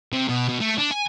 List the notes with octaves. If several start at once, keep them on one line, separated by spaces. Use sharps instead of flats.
C3
B2
B2
A3
D4
G#5